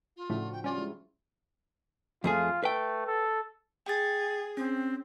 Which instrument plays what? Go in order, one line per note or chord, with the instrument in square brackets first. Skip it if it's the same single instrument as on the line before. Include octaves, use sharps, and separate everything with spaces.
[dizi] F4
[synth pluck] A2 C#3 A3 [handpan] F3 D4 F#4
[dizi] G5
[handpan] G3 [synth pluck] C#4 D5 [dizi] F4
[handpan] G#3 E4
[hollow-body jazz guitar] F2 A3 G#4 [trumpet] F4
[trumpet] A3 [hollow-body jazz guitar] B4 G5
[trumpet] A4
[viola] G#4 [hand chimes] G5 A6
[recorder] C4 [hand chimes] C#4